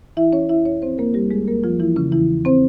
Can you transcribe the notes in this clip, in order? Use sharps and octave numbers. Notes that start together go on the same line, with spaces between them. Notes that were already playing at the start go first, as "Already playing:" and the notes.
E3 E4 E5
C#4 C#5
F2 E4 E5
C#4 C#5
F3 C4 C5
A#3 A#4
F2 G3 G4
G#3 G#4
F2 A#3 A#4
F3 F4
F2 E3 E4
C#3 C#4
E2 E3 E4
C4 C5